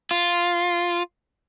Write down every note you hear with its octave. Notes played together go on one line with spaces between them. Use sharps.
F4